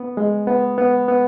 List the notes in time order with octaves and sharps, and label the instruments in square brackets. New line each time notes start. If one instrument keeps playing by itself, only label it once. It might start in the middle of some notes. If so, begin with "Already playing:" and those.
Already playing: [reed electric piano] B3
G#3
B3
B3
B3